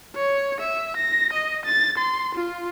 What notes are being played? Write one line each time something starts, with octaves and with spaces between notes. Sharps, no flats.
C#5
E5
A#6
D#5
A6
C6
F4